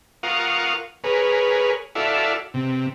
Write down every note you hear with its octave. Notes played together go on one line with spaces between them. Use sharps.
F4 A#4 F5 F#5 C#6 D#6
G#4 A#4 B4 C#5
E4 F#4 A4 D5 E5 F5
C3